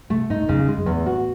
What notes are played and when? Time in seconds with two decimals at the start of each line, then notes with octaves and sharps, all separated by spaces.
0.10 C3 A3
0.29 G#2 D#4
0.42 G#2
0.49 F#2 C#3
0.63 E2
0.68 G#3
0.77 F#2
0.86 E2
0.92 A2
1.06 F#4